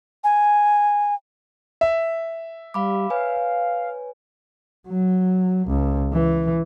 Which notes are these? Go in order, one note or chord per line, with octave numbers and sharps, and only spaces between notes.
G#5
E5
G3 F5 B5 D6
B4 C#5 F5 G#5
F#3
C#2
E3